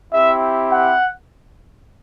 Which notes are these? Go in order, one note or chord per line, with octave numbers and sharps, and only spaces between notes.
C4 E4 G4 E5
F#5